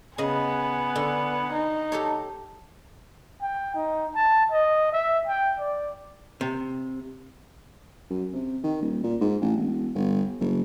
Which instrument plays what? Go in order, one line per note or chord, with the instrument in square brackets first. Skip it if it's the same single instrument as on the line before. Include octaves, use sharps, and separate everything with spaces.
[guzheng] C#3 D#5 B5 [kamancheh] B3 G#5
[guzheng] D3
[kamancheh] D#4
[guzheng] G4 A4 C#5
[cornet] G5
D#4
A5
D#5
E5
G5
D5
[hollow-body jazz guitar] C3
[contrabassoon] F#2
C3
D#3
D#1
A#2
G#2
A1
E1
G1
F#1